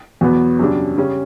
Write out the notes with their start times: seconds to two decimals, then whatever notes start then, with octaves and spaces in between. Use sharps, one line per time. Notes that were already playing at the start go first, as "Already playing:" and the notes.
0.21 E2 B2 F#3 B3
0.59 F#2 C#3 G3 D4
0.97 C#3 G3 C#4